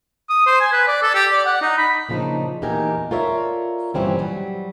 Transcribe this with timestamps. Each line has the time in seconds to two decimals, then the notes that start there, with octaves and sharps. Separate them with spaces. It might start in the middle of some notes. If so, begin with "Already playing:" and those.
0.29 D#6
0.46 C5
0.60 G#5
0.72 B4
0.87 D5
1.02 A4
1.14 G4
1.32 D5
1.46 F#5
1.62 D#4
1.78 B5
2.09 A#2 C#3 F3 B3 D4 D#4
2.62 E2 A#2 D#4 G4 A#4 G#5
3.11 F4 A4 A#4 C#5 D5 E5
3.94 G2 A#2 E3 G3 C4 C#4
4.19 F#3 G3